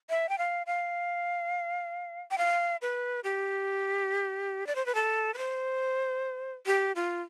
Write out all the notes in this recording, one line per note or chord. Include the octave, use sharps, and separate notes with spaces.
E5
G5
F5
F5
G5
F5
B4
G4
D5
C5
B4
A4
B4
C5
G4
F4